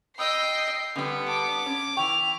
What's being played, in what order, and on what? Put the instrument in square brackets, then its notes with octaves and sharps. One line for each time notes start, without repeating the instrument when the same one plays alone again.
[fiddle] D#5 G5 [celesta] B5 D#6 E6 [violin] C7
[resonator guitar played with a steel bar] D3 G3 [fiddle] B3 [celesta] D4 G5 D#6
[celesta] A5 [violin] D6
[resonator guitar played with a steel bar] C#4
[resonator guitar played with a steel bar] E3 G5 [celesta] C#6 [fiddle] F6